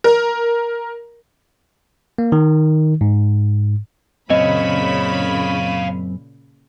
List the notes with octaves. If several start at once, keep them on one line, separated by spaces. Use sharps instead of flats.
A#4
A#3
D#3
G#2
F#2 A#2 C#3 C4 C#5 D#5 F5 B5